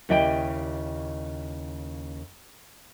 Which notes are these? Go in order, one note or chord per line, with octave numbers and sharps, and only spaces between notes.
D#2 C#3 E4 D5 D#5 G5